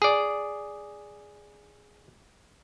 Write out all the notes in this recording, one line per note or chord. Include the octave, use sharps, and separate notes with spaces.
G#4 D5